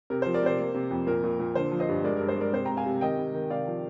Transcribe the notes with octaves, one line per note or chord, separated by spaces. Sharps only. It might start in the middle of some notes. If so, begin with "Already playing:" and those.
C3 A#4
F3 C5
A#4 D5
C3 C5
A#3
C3
F2
A#2 A#4
A#2
A#2
D3 C5
F3
C5 D#5
G2
G#3 A#4 D5
G2 A#4
C5
G#3 A#4 D5
C3 C5
C3 G5 A#5
F5 G#5
C3
D#3 D#5 G5
C3
D#3
C3 D5 F5
F3